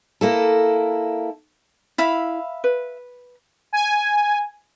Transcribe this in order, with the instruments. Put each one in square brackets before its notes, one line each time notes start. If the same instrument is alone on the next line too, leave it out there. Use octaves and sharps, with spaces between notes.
[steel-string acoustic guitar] A#3 E4 A4
[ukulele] E4 [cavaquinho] E5 F5 B5
[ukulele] B4
[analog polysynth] G#5